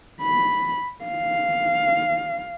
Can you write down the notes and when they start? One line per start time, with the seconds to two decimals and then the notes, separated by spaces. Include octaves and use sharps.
0.22 B5
1.05 F5